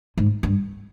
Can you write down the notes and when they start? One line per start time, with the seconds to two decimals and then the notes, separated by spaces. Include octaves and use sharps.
0.18 G#2
0.43 G2